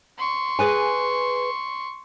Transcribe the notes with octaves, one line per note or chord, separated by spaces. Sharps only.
C6 C#6
G#4 B4 G#5